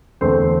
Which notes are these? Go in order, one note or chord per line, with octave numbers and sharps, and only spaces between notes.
E2 D3 A3 C4 C5